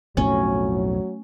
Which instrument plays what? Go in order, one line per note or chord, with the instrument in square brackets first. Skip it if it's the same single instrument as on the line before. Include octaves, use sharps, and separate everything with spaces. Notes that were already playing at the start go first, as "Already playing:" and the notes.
[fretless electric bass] B1 F2 A2 [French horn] F#3 [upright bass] A3 [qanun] C#4